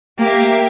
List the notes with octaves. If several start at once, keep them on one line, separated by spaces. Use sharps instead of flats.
A#3 G4 A#4 E5